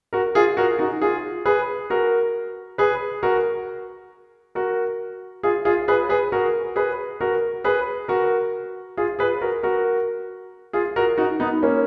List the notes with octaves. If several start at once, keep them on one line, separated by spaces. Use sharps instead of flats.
F#4 A#4
F4 G#4
F#4 A#4
D#4 F#4
F4 G#4
G#4 B4
F#4 A#4
G#4 B4
F#4 A#4
F#4 A#4
F4 G#4
F4 G#4
G#4 B4
G#4 B4
F#4 A#4
G#4 B4
F#4 A#4
G#4 B4
F#4 A#4
F4 G#4
G#4 B4
F#4 A#4
F#4 A#4
F4 G#4
F#4 A#4
D#4 F#4
B3 D#4
A#3 C#4